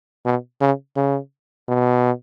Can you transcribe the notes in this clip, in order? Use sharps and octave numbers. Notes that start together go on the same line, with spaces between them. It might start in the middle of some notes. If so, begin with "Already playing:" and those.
B2
C#3
C#3
B2